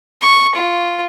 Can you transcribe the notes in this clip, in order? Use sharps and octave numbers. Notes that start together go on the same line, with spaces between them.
C#6
F4